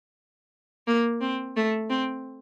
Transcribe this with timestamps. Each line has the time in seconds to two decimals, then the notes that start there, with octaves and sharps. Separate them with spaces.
0.87 A#3
1.21 C4
1.56 A3
1.90 C4